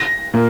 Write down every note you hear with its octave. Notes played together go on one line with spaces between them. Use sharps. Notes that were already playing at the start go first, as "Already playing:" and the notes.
Already playing: A#6
A#2 A#3